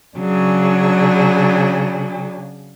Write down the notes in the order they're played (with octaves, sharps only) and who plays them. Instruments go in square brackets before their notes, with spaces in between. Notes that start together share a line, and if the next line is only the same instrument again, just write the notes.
[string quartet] C#3 F#3 D4 G#4